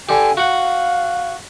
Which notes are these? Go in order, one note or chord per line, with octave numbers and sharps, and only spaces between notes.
D3 G4 G#5
F#4 F5 F#5